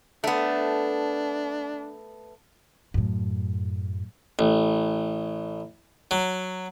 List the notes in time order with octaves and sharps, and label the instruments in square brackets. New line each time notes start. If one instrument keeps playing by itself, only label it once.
[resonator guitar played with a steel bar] A3 B3 [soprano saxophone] D4
[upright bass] F#2 A2
[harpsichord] A1
F#3